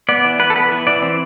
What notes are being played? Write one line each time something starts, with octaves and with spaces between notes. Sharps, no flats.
B3 D5
E3
B3 B4
A4
B3 B4
E3
E3 D5
C4